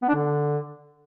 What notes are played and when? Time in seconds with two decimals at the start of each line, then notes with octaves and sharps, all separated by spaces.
0.02 B3
0.09 D4
0.15 D3